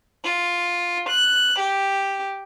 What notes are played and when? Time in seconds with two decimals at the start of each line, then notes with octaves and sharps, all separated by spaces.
0.24 F4
1.08 F#6
1.58 G4